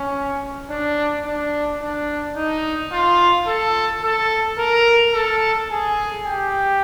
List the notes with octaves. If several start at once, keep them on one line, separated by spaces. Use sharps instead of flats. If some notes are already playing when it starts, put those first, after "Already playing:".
Already playing: C#4
D4
D4
D4
D#4
F4
A4
A4
A#4
A4
G#4
G4